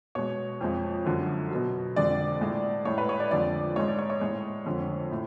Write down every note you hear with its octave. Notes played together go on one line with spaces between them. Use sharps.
B2 G#3 C#5
F2 F3 G#3
F#2 D3 F3 G#3
B2 F#3
F2 D3 G#3 D5
A2 G#3
A2 G#3 C#5
B4
C#5
D5
F2 D3 F3 G#3 D5
G#2 G#3 C#5
D5
C#5
C#5
A2 G#3
F2 D3 F3 G#3
A2